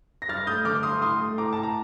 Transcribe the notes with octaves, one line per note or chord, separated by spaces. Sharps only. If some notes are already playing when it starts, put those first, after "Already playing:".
A#6
G2 F6 A6
A3 D#6 G6
D3 D6 F6
G2 C6 D#6
A2 C6 D#6
A3
A2 A#5 D6
A2 A5
A#5